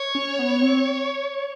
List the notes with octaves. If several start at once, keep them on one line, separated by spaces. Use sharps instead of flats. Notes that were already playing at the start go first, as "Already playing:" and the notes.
Already playing: C#5
C#4
B3
C4